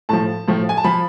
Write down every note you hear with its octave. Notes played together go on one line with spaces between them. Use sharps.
A2 F3 A5
A2 F3
G#5
A5
F3 B5